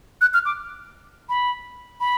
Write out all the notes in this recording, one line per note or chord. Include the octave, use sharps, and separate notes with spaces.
F#6
F6
D6
B5
B5